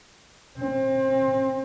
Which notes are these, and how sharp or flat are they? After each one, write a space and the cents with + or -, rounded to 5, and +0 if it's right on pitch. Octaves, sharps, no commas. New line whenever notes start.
C4 +30